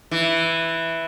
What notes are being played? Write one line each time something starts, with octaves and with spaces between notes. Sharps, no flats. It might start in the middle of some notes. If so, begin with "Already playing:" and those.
E3